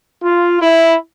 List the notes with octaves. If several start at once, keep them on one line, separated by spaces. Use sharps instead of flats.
F4
E4